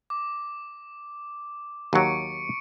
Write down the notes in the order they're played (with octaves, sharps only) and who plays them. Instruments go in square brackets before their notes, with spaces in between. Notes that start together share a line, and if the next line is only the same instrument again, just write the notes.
[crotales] D6
[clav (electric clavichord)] D#2 F#3 [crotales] C#6 C#7 D7